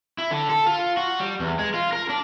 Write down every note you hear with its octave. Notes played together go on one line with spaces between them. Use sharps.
E4
D3
A4
F4
F#4
G3
E2
G#3
F4
A#4
D4